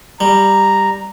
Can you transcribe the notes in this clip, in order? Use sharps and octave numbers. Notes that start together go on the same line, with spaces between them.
G3 A#5